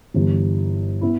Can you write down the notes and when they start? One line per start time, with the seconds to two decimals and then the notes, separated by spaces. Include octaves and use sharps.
0.14 G1 G2 E3
1.01 B3 E4